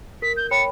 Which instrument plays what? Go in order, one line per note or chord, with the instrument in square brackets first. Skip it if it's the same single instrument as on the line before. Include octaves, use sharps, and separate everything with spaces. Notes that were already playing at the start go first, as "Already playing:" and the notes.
[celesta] A#4 [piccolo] B6
[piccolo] G6
[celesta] C#5 G5 B5 [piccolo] C#7